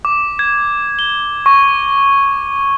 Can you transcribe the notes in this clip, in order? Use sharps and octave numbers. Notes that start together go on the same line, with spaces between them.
D6
G#6
G7
C#6